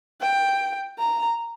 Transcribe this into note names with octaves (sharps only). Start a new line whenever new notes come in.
G5
A#5